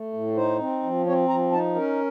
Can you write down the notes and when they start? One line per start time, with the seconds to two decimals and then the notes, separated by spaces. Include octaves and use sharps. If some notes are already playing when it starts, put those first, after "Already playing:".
Already playing: A3
0.13 A2
0.36 D#4 C5
0.60 C4
0.83 F3
1.06 C4 C#5
1.29 F3 A#5
1.52 D#4 A5
1.75 C#4 A#4